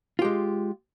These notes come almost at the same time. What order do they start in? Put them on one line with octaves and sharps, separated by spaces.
F4 G4 G#3